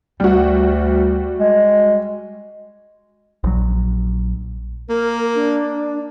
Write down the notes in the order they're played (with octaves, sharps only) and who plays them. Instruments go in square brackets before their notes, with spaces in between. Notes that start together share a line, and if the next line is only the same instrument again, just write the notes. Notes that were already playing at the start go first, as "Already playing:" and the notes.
[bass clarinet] D2 [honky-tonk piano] G3 F#4
[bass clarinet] G#3
[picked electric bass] A#1 F#3
[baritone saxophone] A#3 [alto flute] A#4
[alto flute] D4